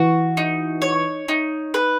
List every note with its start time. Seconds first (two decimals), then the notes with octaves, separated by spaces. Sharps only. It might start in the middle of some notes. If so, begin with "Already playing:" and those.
Already playing: E3 F#4
0.37 D#4
0.82 C#5
1.28 D#4
1.74 B4